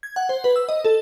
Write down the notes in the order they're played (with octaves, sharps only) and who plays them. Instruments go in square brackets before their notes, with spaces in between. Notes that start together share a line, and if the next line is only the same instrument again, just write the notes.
[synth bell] G#6
F#5
C5
B4
E6
D#5
A4